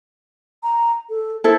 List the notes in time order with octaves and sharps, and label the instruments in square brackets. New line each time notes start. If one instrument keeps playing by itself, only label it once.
[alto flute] A#5
A4
[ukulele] E4 A4 [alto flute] C5